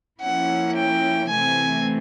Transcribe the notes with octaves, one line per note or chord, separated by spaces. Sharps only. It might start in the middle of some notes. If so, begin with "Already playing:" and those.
F3 A#3 C#4 E4 F#5
G5
C3 E3 A3 C4 G#5